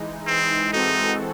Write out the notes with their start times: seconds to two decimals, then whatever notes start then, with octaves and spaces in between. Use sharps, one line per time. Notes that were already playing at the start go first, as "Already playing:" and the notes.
Already playing: E3 G#3 D#4
0.27 C4
0.73 E3 G#3 C4 D#4 F#4 A4